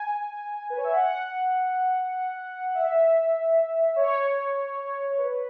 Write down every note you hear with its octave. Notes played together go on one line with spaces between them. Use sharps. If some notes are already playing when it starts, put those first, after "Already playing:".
Already playing: G#5
B4
C#5
E5
F#5
E5
C#5
B4